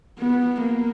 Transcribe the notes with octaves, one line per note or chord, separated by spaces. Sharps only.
B3
A#3